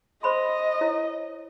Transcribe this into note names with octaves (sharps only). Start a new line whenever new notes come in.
C5 D#5 B5 C6
E4 C#5